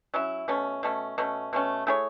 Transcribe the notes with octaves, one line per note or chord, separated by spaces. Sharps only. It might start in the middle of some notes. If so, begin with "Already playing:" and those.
F#3 C#4 E4
B2 A3 C#4
B2 A3 C#4
B2 A3 C#4
B2 A3 C#4
A3 E4 G#4 C#5